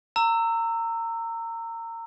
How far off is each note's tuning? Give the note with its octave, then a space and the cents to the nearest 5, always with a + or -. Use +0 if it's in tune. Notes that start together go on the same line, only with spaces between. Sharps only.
A#5 -25 E6 +5